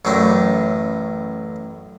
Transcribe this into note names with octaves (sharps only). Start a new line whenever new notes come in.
A1 F#2 A2 D4